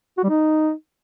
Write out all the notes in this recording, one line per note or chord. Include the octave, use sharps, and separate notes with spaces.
F#4
G3
D#4